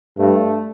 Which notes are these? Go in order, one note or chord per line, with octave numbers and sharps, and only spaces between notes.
G2 A3